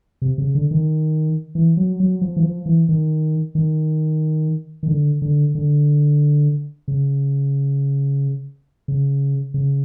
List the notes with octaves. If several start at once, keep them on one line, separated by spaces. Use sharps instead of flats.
C3
C#3
D3
D#3
E3
F#3
F#3
F3
E3
F3
E3
D#3
D#3
D#3
D3
D3
D3
C#3
C#3
C#3